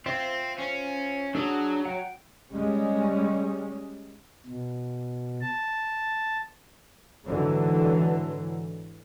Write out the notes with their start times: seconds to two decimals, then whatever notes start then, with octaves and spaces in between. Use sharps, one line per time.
0.06 C4 F4 C5 E5
0.58 C#4
1.35 F#3 D4 G#4 E6
1.85 F#5 G5
2.53 G3 G#3 C#4
4.46 B2
5.41 A5
7.25 G#2 D3 E3 F#3